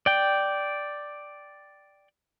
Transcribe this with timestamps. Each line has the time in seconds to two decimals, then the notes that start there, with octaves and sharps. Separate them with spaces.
0.06 D5 G5